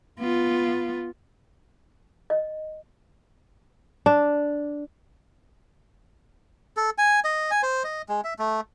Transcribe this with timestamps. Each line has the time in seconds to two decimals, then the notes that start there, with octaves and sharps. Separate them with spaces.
0.19 B3 F4
2.30 D#5
4.06 D4
6.77 A4
6.98 G#5
7.24 D#5
7.51 G#5
7.63 C5
7.84 D#5
8.09 G#3
8.24 E5
8.39 A3